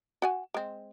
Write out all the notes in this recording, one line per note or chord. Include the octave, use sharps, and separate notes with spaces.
F#4 F#5 G#5
G#3 C4